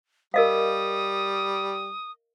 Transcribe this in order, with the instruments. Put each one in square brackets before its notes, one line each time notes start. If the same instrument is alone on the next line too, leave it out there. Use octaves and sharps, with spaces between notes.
[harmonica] G3 [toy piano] A#4 D#5 F5 [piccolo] D#6